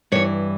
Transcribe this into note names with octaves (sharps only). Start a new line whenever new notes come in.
G2 E3 C#5